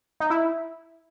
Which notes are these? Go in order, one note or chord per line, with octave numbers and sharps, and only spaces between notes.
D#4
E4